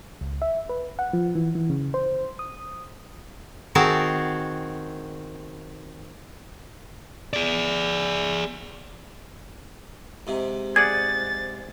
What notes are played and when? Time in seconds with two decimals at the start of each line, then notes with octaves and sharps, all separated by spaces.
0.21 C#2
0.42 E5
0.69 B4
0.99 F#5
1.13 F3
1.35 E3
1.55 E3
1.70 C#3
1.94 C5
2.39 D#6
3.75 D#3 C4 F#4 G#4 A#4 A5
7.33 G#4 D5
10.27 G#2 C3
10.76 G#4 D5 F#5 G#6 A6